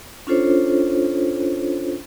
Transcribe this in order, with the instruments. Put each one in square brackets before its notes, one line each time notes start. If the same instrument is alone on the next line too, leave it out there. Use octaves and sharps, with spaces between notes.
[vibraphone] C#4 D4 F4 A4 C5 C#5